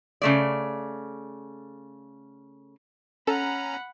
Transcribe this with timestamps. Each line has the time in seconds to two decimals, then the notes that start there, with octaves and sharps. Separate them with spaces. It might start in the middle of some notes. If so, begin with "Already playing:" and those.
0.22 C#3 A3 D5
3.27 C#4 A4 F#5 A#5 B5